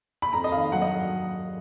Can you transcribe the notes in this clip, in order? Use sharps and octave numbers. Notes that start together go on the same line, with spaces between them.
B5
F2 A#5
D#5
D#3 F5
F#3 F#5
D#5